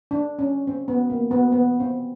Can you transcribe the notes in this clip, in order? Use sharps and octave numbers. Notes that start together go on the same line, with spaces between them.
D4
C#4
C4
B3
A#3
B3
B3
C4